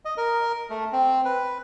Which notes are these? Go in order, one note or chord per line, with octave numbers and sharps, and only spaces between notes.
D#5
A#4
A3
C4
B4